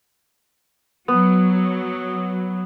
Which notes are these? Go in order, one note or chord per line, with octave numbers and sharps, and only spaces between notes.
F#3 B3